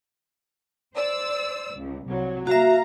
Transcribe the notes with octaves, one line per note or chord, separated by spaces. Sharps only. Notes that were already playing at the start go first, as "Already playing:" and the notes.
C5 D5 E6
C#2
C2 F#3
A#3 F#4 E5 F5 A#5